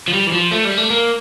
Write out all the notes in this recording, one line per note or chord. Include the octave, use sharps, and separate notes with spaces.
F3
G3
E3
F3
A3
G3
A3
A#3